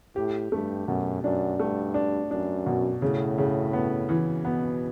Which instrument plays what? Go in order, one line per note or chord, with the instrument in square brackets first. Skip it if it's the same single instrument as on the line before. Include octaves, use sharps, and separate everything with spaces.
[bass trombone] A2 [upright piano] G4
[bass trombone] G2 [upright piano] A3
[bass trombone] F#2 [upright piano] B2
[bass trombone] F#2 [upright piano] D4
[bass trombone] G2 [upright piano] A3
[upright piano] D4
[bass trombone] F#2 [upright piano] D4
[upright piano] B2
[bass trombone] A2 [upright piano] C#3
[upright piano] C#3
B3
E3
[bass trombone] B2 [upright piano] B3